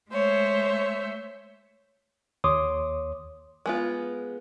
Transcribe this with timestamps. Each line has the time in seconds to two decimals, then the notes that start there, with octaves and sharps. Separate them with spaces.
0.11 G#3 A3 C5 C#5 E5
2.44 D#2 C#5 C6 D6 D#6
3.66 G#3 B3 F4